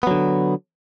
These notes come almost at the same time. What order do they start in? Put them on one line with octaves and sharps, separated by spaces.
B3 F#3 D3